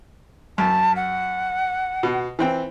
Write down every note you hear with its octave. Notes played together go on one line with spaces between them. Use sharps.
F#2 A5
F#5
B2
E3 C4 G5